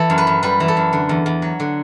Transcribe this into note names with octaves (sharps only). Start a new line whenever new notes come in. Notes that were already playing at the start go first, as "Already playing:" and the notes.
Already playing: E3 A4
F#2
B4
F#2
G3 B4
E3
A4
F#2
D3
E2
E2
F#3
D3